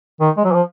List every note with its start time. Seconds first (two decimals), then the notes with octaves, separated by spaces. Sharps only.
0.21 D#3
0.37 G#3
0.44 F#3
0.52 F3